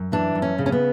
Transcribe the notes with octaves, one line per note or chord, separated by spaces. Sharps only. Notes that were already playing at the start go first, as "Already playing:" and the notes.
Already playing: F#2
E3 D4
F#2
C#4
C#3
C#4
B3